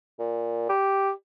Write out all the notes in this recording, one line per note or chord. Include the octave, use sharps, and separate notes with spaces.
A#2
G4